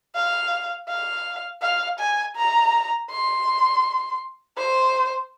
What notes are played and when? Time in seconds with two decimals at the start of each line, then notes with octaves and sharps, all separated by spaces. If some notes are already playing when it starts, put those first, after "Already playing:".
0.15 F5
0.88 F5
1.62 F5
1.99 G#5
2.36 A#5
3.10 C6
4.58 C5